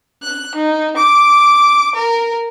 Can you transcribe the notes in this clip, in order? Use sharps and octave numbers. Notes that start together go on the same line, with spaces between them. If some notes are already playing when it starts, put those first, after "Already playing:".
F#6
D#4
D6
A#4